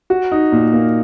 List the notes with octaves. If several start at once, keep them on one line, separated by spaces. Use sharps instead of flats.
F#4
D#4
A#2
A#3